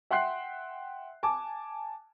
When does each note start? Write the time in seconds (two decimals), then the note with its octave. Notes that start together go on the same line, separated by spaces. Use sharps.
0.11 E5 F#5 G5 C6 F#6 C7
1.23 G#5 A5 D6